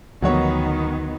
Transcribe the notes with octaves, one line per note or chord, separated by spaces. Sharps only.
D2 D#3 F3 F#3 B3 F#4 C#5